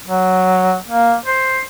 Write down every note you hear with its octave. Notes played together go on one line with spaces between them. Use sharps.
F#3
A#3
C5